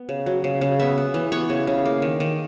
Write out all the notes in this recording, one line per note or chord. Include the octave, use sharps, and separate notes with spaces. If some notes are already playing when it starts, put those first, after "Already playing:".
Already playing: B3
C#3
F#3
C#3
C#3
B3 E5
B3
E3
B3 C#5
C#3
C#3
A#3
D#3
D#3